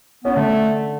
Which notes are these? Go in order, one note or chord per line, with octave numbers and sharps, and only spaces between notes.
B3 C#4
D3 A3 D4